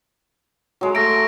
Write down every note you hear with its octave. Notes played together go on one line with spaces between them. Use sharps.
F#3 G#3
A3 A#6 D7